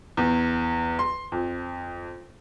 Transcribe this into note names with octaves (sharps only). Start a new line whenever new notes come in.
E2
C6
F2